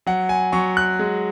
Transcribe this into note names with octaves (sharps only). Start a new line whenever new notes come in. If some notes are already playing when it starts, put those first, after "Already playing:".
F#3 F#5
G#5
F#3 C#6
F#6
G#3